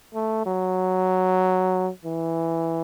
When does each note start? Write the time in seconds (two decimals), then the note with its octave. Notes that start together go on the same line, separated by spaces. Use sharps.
0.14 A3
0.46 F#3
2.05 E3